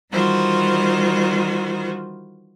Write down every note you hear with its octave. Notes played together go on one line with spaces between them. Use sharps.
D#3 E3 G3 F4 F#4 C5